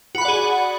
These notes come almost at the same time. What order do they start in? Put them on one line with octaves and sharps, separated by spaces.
F#4 B5 F#5 D5 G#4